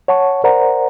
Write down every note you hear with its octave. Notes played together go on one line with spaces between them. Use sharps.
C#5 F#5 A5 C#6
A#4 C5 D5 F#5 A#5